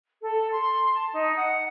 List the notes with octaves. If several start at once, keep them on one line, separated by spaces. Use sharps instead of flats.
A4
C6
A5
D#4
F#5